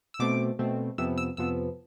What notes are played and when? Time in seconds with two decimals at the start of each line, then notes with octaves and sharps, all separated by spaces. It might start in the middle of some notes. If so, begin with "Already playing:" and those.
0.14 E6
0.19 B2 A3 C4 D6
0.59 B2 A3 C4
0.98 F2 C3 F3 B3 E6
1.18 E6
1.37 F2 C3 F3 B3 E6